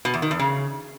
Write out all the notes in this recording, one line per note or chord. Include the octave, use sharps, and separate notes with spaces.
B2
E2
D#3
E2
C#3